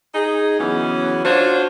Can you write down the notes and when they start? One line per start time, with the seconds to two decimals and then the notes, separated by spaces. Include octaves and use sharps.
0.15 D#4 G#4
0.59 C#3 E3 F#3 B3 C#4
1.25 D4 F4 F#4 C5 C#5